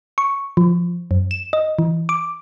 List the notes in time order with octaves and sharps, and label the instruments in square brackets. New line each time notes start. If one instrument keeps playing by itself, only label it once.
[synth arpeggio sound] C#6
F3
F#2
E7
D#5
E3
D6